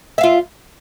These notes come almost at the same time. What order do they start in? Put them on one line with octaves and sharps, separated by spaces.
E5 F5 F4